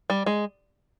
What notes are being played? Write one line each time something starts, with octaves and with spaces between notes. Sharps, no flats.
G3
G#3